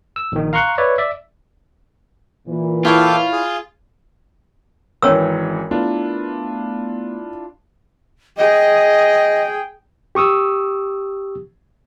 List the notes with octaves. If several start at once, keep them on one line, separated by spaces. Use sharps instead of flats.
E6
A#1 D#3
F5 A#5 C6 C#6 F#6
B4 C#5 D5 E5
D5 E5
A#2 E3
E4 F4 A4 C#5 F5 G5 D6
G#4
G#1 E3 C#4 A#4 C#5 E6
A3 B3 D4 E4 F4
G#4 D#5 G5
G4 C#6 D#6 E6